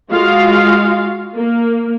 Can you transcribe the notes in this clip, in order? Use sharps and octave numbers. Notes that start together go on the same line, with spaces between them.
G#3 F4 F#4 F5
A#3